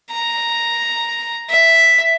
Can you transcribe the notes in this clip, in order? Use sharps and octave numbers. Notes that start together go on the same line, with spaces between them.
A#5
E5